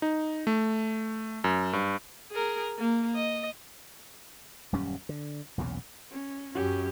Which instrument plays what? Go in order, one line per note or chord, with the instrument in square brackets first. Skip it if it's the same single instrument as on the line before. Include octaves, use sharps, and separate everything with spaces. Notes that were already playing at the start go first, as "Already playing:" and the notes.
[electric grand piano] D#4
A3
F#2
G2
[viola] G#4 A#4
A#3
D#5
[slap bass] D#1 F#2 G3 C#4
D3
B1 E2 A#2 C#3
[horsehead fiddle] C#4
[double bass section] F#2 [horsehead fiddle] C#4 G4